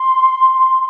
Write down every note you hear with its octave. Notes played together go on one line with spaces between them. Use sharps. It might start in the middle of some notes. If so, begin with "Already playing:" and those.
Already playing: C6